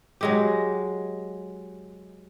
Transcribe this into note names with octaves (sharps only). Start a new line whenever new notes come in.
F#3 G#3 G4